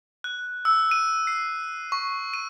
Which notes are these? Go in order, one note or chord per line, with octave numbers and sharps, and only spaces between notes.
F#6
E6
D#7
C7
C#6
D#7